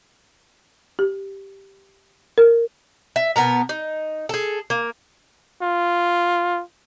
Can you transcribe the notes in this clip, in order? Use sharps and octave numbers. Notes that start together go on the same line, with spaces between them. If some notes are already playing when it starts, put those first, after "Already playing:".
G4
A#4
E5
B2 B3 A#4 A#5
D#4
G#4 A4
A#3
F4